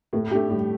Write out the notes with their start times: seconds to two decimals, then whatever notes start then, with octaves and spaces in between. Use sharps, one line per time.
0.13 A2 A3
0.31 A3 D4 G4
0.49 A2 G3